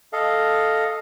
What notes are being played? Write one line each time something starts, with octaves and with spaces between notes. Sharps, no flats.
A4 D#5 F5